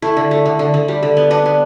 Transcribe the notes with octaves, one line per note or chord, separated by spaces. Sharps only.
A3 E4
D3
A3
D3
D3
D3
G3
D3
B3
B3 D4
B3